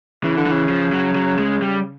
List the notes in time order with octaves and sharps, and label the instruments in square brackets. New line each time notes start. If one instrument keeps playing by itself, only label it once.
[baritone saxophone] C#3 [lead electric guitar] E3
[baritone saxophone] D3
[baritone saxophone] C#3 [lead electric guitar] E3
[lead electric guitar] F3
F#3
F#3
G#3
G3